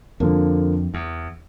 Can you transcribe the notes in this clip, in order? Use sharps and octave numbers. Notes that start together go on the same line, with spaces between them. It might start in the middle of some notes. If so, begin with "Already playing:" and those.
F2 D3 F3 A#3 D4
E2